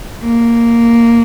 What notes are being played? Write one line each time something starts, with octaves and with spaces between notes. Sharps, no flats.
A#3